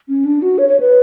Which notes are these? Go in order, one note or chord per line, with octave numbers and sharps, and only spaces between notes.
C#4
D4
F#4
C#5
C#5
B4